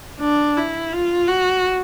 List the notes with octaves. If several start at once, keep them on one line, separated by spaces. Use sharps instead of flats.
D4
E4
F4
F#4